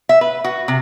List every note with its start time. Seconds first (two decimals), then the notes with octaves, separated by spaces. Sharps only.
0.09 E5
0.21 B4
0.44 F#4
0.68 C3